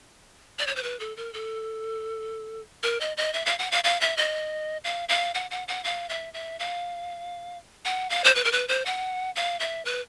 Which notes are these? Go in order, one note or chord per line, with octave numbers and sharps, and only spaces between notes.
D5
C#5
C5
B4
A4
A#4
A4
A#4
D#5
D#5
E5
F5
F#5
F5
F5
E5
D#5
F5
F5
F#5
F#5
F#5
F5
E5
E5
F5
F#5
F5
C5
B4
A#4
B4
C5
F#5
F5
E5
B4